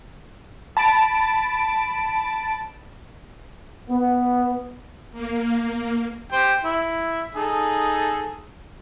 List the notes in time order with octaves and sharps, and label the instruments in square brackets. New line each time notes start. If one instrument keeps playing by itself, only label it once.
[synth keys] A5 B5 A6 D7
[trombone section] B3
[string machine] A#3
[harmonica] G4 C5 G5
E4
D#4 G#4 A4